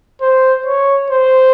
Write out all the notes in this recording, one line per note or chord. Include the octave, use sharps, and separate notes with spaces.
C5
C#5
C5